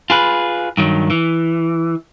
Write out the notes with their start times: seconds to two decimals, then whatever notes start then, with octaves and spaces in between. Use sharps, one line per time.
0.10 F4 G#4 B4
0.77 G2 D#3 F#3
1.10 E3